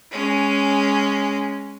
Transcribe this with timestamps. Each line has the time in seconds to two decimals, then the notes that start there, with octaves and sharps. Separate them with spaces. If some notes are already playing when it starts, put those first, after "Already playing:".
0.11 G#3 C#4